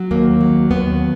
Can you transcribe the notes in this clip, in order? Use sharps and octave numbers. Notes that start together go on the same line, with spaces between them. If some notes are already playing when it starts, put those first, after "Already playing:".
Already playing: F#3
D#2 A#3
F#3
D#2 B3